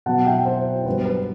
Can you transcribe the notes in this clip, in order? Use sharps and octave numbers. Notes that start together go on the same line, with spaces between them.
B2 F#3 B3 F#5 A5
E5 G5
C5
C5
G2 F#3 B3 B4
B4